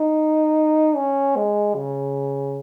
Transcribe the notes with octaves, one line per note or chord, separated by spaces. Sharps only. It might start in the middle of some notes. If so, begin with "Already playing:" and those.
Already playing: D#4
C#4
G#3
C#3